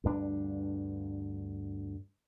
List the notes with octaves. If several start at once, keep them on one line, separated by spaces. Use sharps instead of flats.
D2 G2 D4